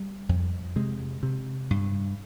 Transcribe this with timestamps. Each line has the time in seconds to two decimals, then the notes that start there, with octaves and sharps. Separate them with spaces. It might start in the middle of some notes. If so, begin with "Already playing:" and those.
Already playing: G3
0.29 F2
0.76 C3 G#3
1.23 C3
1.71 G2